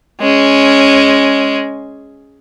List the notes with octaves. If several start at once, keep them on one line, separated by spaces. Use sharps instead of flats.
G#3 C#4